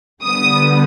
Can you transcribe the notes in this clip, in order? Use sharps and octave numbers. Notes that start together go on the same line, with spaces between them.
D3 G3 B3 D#6